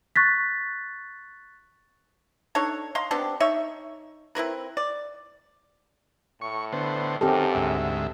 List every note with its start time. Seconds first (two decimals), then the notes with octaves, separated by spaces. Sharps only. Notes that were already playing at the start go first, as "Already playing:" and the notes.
0.16 C#6 F#6 A6 B6
2.55 D4 D#4 A4 C#5
2.95 D#5 F5 A#5 C6
3.11 B3 C4 D4 G4
3.40 D#4 C#5 E5
4.35 C4 E4 A#4 B4
4.77 D5
6.41 A2 C#6
6.72 D3 B3 C5
7.21 F#2 D#3 C4 G4 A4
7.55 D2 G#2 E5